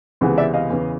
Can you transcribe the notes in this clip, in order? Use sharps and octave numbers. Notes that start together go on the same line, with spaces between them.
C#2 C3 E3 G#3 B3
D5 E5
D#5 F5
E2 C#3 E3